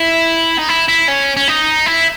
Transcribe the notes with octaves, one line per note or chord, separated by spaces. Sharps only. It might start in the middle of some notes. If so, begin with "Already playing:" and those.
Already playing: E4
D#4
E4
E4
C#4
C#4
D#4
E4